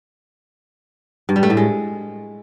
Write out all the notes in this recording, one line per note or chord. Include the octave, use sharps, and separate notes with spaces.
G2
G3
A3
A2
G#3